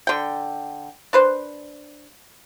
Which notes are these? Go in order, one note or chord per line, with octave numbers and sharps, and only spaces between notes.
D3 G5
D4 B4 C5